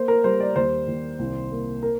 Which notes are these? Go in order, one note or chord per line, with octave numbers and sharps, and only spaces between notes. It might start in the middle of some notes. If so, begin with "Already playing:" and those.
Already playing: A#3 C5
A#4
G3 C5
D5
D#2 C5
D#2
C2
A#3
A#4